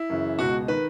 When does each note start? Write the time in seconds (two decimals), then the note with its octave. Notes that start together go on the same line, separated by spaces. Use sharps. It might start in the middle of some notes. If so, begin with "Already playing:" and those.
Already playing: E4
0.10 F#2 C#3 E3
0.39 C#2 B2 F#4
0.68 D#3 B4